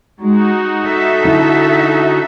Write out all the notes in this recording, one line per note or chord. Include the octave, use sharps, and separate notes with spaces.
G#3 D#4 F#4
A4 E5
D3 C#4 E4